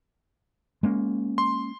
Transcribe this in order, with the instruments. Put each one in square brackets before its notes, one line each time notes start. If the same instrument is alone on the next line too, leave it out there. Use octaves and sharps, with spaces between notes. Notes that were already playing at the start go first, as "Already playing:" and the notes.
[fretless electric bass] G#3 A#3 C#4
[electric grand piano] C6